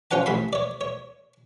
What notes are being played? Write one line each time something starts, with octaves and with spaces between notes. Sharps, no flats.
C#4 F4 C5 F#5 A5
A1 B5 C6
C#5 D5
C#5